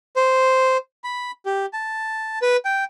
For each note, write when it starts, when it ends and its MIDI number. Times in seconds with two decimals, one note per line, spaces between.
0.16 0.77 72
1.04 1.31 83
1.46 1.66 67
1.73 2.39 81
2.42 2.57 71
2.65 2.84 79